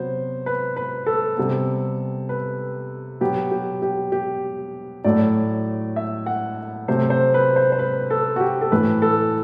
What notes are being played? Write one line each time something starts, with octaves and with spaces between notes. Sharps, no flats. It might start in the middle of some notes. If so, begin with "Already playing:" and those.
Already playing: C3 F#3 B3 C5
B4
B4
A4
C3 G3 B3
B4
B2 F#3 B3 G4
G4
G4
G4
A2 F#3 A3 D5
E5
F#5
C3 F#3 A3 C5
C5
B4
C5
C5
B4
A4
F#4
G4
A4
A2 E3 A3 B4
A4